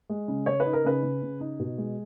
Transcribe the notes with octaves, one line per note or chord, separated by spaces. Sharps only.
G#3
C#3
C#3 C#5
B4
D#4
A#4
C#3 B4
C#3
C#3
D#4
B2
G#3